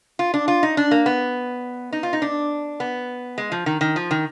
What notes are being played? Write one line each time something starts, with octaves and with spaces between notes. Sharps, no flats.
F4
D4
F4
D#4
D4
A#3
B3
D#4
F4
D#4
D4
B3
G#3
F3
D#3
D#3
F3
D#3